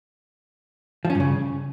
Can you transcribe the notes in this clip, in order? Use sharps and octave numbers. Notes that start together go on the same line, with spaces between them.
F3
C#4
G2
C#3